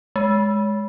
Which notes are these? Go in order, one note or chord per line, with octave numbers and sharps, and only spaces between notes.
G#3